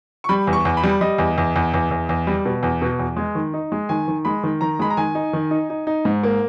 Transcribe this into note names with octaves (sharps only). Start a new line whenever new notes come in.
C#6
G3 B5
E2
C#6
E2
B5
G3
G3 D#5
E2
E2
E2
E2
E2
E2
G3
B2
E2
B2
E2
G#3
D#3
D#4
G#3
D#3 G#5
D#3
G#3 B5
D#3
D#3 A#5
G#3 B5
A#5
D#3 G#5
D#4
D#3
D#4
D#4
D#4
G#2
A#3